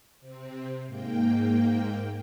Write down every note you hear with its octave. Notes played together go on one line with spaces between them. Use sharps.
C3 C4
G#2 A#3 G5